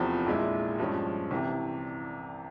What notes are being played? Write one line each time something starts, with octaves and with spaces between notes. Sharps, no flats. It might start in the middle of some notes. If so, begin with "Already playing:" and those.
Already playing: F1 E2 C3 F3
A#1 A#2 G#3 E4
G2 F3 G#3 C#4
C2 C3 E3